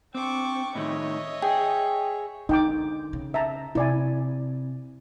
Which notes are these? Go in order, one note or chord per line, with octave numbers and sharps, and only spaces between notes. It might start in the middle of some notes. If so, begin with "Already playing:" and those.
C4 D4 G5 C#6 D6
A2 D#3 C#5 D#5 E5
G#4 G5
D3 D#4 G5 D6
C#3
E5 A5 A#5
C3 E4 D5 G#5